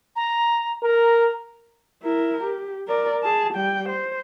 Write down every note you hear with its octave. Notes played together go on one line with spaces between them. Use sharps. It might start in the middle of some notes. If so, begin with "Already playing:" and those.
A#5
A#4 A#5
E4 A#4
G4
A#4 D5
G#4 A5
G3 G5
C5